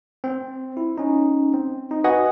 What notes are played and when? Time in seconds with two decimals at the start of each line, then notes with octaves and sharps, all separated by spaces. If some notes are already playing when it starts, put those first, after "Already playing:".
0.24 C4
0.77 E4
0.98 C#4 D#4
1.54 C4
1.91 D#4
2.04 F#4 B4 D#5 F#5 G#5 D#6